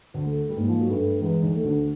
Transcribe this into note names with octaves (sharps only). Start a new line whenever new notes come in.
D2 D3
A3
G3
G#2 G#3 A#3
F3
F#3
G2 G3 A3
E2 E3 G#3
D#2 D#3
A3
D2 D3